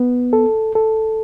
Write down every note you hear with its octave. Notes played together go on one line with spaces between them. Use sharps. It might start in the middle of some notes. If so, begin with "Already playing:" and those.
Already playing: B3
A4
A4